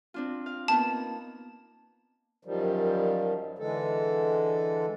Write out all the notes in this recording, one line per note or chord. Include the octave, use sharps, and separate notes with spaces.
C4 D4 F4
F5
A#3 B3 D#4 A5
F#2 D#3 F3 G3
D3 E3 G#3 A4